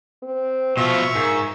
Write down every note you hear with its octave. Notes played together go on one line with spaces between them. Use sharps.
C4
B2 F3 F4 E5 C#6 E6
G#2 A#4